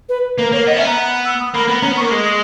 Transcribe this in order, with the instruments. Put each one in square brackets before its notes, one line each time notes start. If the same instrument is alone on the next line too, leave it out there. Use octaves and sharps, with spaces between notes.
[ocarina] B4
[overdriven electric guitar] A#3 [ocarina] B4
[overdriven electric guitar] A#3 [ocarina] C#5
[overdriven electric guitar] B3 [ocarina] D#5
[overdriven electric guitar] C#4 [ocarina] E5
[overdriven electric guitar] B3 [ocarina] A#5
[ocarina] E6
D#6
[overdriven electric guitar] A#3 [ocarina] B5
[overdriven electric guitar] B3
[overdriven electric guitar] C#4 [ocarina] A#5
[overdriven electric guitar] B3
[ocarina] C#6
[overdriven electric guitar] A#3
G#3
[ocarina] D#6